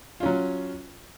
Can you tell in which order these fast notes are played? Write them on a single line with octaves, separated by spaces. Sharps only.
F4 C#4 F#3